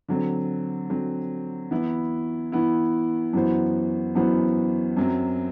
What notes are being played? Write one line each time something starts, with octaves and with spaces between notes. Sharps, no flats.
D3 F#3 C4
D3 F#3 C4
E3 B3 E4
E3 B3 E4
F#2 E3 B3 F#4 C5
F#2 E3 B3 F#4 C5
F#2 F#3 C4